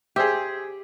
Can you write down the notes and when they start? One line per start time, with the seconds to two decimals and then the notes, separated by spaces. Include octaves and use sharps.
0.16 G4 G#4 C5 E5